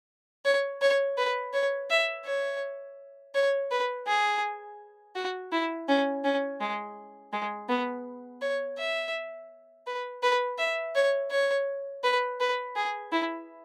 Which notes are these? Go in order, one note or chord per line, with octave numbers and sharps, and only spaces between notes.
C#5
C#5
B4
C#5
E5
C#5
C#5
B4
G#4
F#4
E4
C#4
C#4
G#3
G#3
B3
C#5
E5
B4
B4
E5
C#5
C#5
B4
B4
G#4
E4